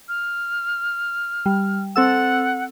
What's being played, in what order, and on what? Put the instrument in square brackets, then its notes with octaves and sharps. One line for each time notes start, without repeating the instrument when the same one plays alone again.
[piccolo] F6
[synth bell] G3
[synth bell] C4 A4 E6 [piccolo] F#5